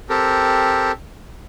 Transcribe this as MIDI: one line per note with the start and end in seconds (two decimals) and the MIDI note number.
0.09 0.92 60
0.09 0.92 67
0.09 0.92 69
0.09 0.92 70